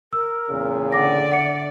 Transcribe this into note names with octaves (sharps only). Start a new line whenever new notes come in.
A#4 E6
E2 A#2 C#3
D3 D5 F#5 D6 A#6
E5 F#5 C#7